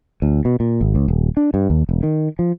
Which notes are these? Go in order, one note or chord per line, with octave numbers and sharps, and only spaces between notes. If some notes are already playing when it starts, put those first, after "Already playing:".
D2
B2
A#2
G#1
C#2
D#1
D4
G2
D#2
E1
D#3
F3